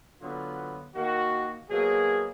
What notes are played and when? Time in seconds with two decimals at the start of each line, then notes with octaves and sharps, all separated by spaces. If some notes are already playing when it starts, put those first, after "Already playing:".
0.21 D3 F#3 B3 F4
0.95 D#3 A#3 F#4
1.69 B2 F#3 A#3 G#4